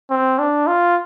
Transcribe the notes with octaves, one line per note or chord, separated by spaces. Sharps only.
C4
D4
F4